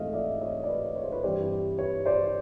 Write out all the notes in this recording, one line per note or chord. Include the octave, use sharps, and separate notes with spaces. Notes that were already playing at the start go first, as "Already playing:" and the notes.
Already playing: G#2 E3 A3 C4 D#5 F5
D5 E5
C#5 D#5
D5
B4 C#5
C#5
C5
B4 C#5
G2 E3 G3 C4 C5 D5
B4 C#5
C5 D5